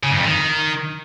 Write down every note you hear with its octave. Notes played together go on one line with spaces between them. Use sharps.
C#3
G2
F2
D#3